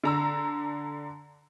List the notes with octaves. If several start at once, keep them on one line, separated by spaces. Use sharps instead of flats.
D3 A#5 E6